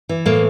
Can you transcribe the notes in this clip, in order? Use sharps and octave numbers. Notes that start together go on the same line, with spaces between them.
E3
A2 A#3